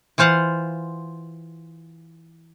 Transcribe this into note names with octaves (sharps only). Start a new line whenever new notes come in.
E3 F4 C5 F5 F#5